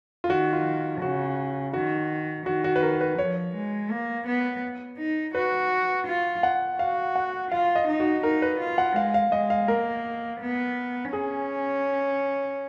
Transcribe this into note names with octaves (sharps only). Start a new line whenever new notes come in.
F4
D#3 F#4
F4
C#3 F#4
D#3 F#4
D#3 F#4
F#4
B4
A#4
B4
F3 C#5
G#3
A#3
B3
D#4
F#4 B4
F4
F#5
F#4 F5
F#5
F4 F5
D#5
D#4
F#4
D#4 A#4
B4
F4
F#5
G#3 F5
F5
G#3 D#5
F5
A#3 A#4
B3
C#4 G#4